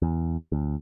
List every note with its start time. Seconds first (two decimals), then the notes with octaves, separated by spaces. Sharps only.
0.02 E2
0.52 D2